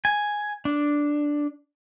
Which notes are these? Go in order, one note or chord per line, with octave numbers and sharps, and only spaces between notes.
G#5
D4